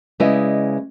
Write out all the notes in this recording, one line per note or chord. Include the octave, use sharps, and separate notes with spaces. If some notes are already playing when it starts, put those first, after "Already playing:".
C#3 G#3 E4 B4 D5 D#5